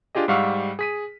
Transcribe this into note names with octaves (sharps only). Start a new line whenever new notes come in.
D4 F4 G4 G#4 D#5
G#2 G3 F5 F#5 C#6 E6
G#4 B6 D#7